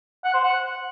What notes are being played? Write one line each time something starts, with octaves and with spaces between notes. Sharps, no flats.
F#5
C5
F#5